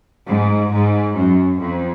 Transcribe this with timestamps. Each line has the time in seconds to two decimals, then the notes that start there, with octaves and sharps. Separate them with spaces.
0.26 G#2
0.71 G#2
1.15 F#2
1.60 F2